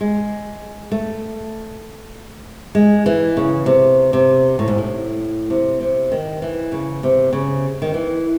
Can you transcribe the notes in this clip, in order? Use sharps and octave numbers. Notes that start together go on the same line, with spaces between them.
G#3
A3
G#3
E3
C#3
C3
C3
A2
G#2
A2
C3
C3
D#3
E3
C#3
C3
C#3
D#3
E3